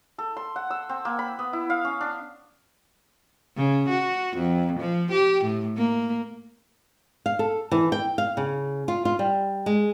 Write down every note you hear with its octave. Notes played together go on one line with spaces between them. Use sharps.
A4
C6
F#5
E6
C4
A#3
B5
B3
E4
F5
C#4
D4
C#3
F#4
F2
F3
G4
A2
A#3
F5
A4
E3
G5
F5
C#3
F4
F4
G3
G#3